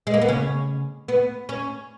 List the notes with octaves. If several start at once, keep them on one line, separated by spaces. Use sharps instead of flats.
G#3
A#3
B3
C#3 C#4
B3
C#4